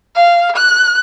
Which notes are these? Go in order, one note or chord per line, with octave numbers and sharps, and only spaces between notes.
F5
F#6